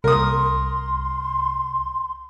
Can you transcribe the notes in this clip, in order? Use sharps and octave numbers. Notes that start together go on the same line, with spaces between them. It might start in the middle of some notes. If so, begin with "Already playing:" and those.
C2 A#4 C6 D#6